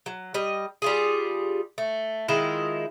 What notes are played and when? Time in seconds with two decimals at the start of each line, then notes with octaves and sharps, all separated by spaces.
0.06 F#3
0.34 G3 D#5
0.82 G3 F4 G#4
1.78 A3
2.28 D#3 G#3 E4 F4